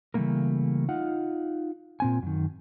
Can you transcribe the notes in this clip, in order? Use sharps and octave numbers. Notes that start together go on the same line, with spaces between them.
C#3 E3 G3 A3 A#3 A#4
D#4 F4 F5 F#5
A#2 C4 G#5
F#2 D#3